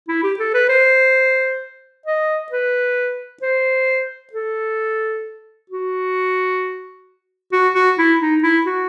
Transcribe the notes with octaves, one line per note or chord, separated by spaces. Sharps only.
E4
G4
A4
B4
C5
D#5
B4
C5
A4
F#4
F#4
F#4
E4
D#4
E4
F#4